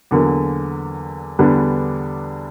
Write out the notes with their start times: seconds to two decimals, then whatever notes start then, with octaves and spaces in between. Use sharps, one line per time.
0.11 E2 D3 F#3 A#3
1.39 E2 D3 G3 B3 D4